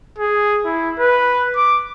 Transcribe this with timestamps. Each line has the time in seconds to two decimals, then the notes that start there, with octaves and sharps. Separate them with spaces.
0.18 G#4
0.65 E4
0.99 B4
1.56 D6